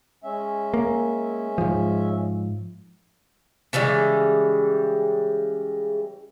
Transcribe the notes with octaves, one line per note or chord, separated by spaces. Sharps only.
G#3 C#4 E5
A#3
G#2 F3
C#3 E3 G3 G#3